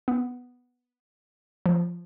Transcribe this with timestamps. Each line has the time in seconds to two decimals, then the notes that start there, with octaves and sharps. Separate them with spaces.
0.08 B3
1.66 F3